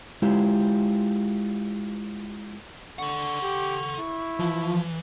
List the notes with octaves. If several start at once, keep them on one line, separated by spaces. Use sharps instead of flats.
G#3 E4 F4 G4
D3 A4 F#5 C#6
G4
E4
E3 F3